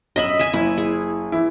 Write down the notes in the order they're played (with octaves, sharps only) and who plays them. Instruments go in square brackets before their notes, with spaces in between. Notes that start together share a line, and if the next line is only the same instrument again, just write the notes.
[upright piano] F#2 F#7 [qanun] D#5 E5 B5
[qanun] E5 G#5
[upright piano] F#1 [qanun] E4
[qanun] G#4
[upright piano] E3 E4